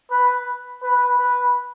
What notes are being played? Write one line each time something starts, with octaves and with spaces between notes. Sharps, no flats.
B4
B4
B4